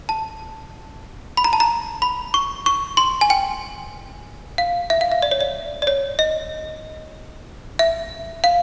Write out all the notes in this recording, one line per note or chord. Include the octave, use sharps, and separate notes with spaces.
A5
B5
A#5
A5
A#5
B5
C#6
C#6
C6
G#5
G5
F5
E5
F5
E5
D5
C#5
D5
D5
C#5
D#5
E5
F5